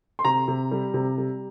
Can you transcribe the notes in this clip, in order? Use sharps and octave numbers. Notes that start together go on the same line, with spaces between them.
C6
C3 A#5
C3
G3
C3
G3